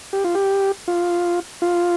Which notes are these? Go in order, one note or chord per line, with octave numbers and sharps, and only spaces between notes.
G4
F4
G4
F4
F4